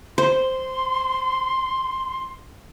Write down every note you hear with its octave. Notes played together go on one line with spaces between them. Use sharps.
C5 C6